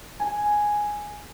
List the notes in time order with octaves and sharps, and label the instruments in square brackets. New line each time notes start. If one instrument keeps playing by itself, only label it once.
[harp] G#5